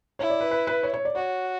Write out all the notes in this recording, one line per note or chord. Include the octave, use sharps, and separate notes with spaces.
E4 C#5
D5
B4
B4
B4
C#5
C#5
D5
F#4 C#5